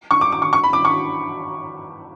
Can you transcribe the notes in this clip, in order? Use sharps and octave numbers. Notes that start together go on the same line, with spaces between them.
C#6
D6
D6
C#6
C#6
B5
D6
C#6